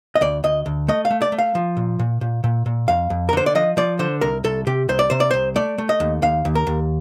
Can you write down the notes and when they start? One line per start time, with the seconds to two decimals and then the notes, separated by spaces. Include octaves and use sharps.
0.15 D#5
0.21 D2 D5
0.44 D2 D#5
0.66 D2
0.88 A3 D#5
1.05 F5
1.10 A3
1.22 D5
1.32 A3
1.38 F5
1.55 F3
1.77 A#2
1.99 A#2
2.21 A#2
2.44 A#2
2.66 A#2
2.88 F2 F5
3.10 F2
3.29 A#4
3.33 D3 C5
3.46 D5
3.55 F3 D#5
3.77 F3 D5
3.99 D3 C5
4.21 C2 A#4
4.44 C2 A4
4.67 C3 G4
4.89 C2 C5
4.99 D5
5.10 C3 C5
5.20 D5
5.31 C2 C5
5.56 A3 D5
5.78 A3
5.89 D#5
6.00 D#2
6.22 D#2 F5
6.45 D#2
6.55 A#4
6.67 D#2